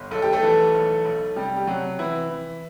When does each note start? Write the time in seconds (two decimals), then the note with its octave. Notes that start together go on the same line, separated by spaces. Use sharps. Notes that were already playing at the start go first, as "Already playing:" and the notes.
Already playing: G1
0.11 B1 A4
0.22 G4
0.33 A3 A4
0.42 E3
0.74 B1
1.05 B1
1.36 C3 G3 G4
1.57 G4
1.67 C3 F#3 F#4
1.99 C3 E3 E4
2.30 E3